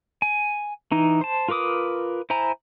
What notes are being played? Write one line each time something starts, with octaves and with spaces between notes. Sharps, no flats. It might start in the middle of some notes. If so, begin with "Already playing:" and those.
G#5
E3 D#4
C5 A5
F4 A#4 B4 D6 D#6
E4 C5 G#5 A#5